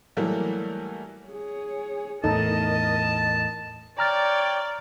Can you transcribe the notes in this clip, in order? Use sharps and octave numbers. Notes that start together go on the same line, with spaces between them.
E3 F#3 G3 A3 A#3
G#4 C#5
E2 A2 D#4 A4 A#4 D#5 A5
C#5 D5 G5 A#5 F6 A6